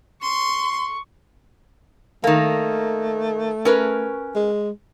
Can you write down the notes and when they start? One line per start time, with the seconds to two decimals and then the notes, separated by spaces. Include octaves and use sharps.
0.22 C6 C#6
2.24 D#3 A3 A#3
3.65 C#4 A#4 B4
4.36 G#3